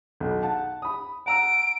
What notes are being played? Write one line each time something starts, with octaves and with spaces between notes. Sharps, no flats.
B1
F#5 A5
B5 D#6
F#5 A#5 E6 D7